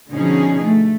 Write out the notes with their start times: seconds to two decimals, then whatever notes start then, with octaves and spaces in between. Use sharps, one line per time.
0.12 B2 D3 F3 C#4 D#4 G#4
0.63 A3